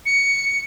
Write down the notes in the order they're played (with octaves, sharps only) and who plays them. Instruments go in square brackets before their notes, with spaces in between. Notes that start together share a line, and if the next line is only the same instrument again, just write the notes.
[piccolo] C#7